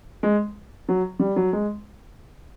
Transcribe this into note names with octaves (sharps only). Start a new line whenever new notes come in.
G#3
F#3
G3
F#3
G#3